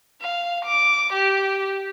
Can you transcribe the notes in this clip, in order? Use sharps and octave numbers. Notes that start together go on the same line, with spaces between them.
F5
D6
G4